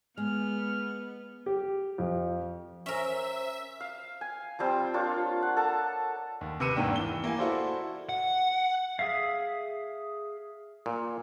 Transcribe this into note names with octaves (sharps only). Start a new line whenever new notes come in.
G#3 B3 F6
G4
F2
C#4 A#4 C5 E5
F5
G#5
F3 G3 C4 F4
A#3 D4 F4 C#5
F#5
A4 A5 A#5
D#2
C3 B4 E6 C#7 D#7 E7
G#1 E2 D#3 A#3 D4 G5
E3 G7
A#3 E4 G#5
E4 F#4 A4 C5 D5
F#5
G#4 A#4 E5 F5
A#2